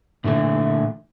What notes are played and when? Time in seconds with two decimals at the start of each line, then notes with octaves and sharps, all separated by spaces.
0.24 A#2 D3 E3 A3